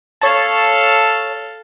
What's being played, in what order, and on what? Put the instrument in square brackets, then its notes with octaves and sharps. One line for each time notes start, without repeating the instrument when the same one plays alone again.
[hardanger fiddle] A4 F5 [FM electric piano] C#5 A5